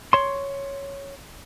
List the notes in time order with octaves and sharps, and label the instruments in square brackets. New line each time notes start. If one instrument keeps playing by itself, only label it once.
[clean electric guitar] C#5 C6